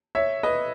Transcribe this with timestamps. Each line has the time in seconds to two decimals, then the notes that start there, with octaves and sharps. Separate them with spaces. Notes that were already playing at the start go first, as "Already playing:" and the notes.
0.15 C#5 E5
0.43 B4 D#5